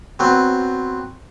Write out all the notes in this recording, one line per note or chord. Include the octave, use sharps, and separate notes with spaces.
F#3 B3 C4